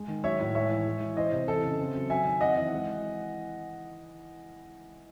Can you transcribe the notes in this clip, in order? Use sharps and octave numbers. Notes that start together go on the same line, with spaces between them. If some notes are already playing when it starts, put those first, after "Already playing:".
Already playing: G#3
D#3
F#3 C#5 E5
A2
G#3 C#5 E5
E3
G#3
E3
E3 C5 D#5
C3
E3 A4
C#3
C4
F#3
F#3 E5 G#5
D#3
C4 D#5 F#5
E3
G#3